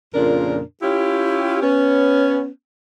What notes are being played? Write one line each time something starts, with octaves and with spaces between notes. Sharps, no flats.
F2 A#2 C#3 D4 A#4
C#4 E4 F4 G4
B3 C#4